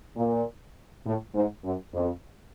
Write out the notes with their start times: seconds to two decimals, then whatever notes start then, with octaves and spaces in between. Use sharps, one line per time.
0.17 A#2
1.06 A2
1.35 G#2
1.65 F#2
1.94 F2